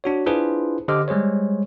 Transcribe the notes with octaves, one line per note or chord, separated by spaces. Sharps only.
D4 F#4 C#5
D4 E4 F4 G#4 B4 C5
D3 G4 C5 D#5 D6 F6
G3 G#3 G#4 C5 C#5